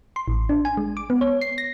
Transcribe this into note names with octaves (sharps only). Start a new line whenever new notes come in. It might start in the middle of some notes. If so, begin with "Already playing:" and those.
C6
A1
D4
G#5
G#3
D6
B3
C#5
C7
A#6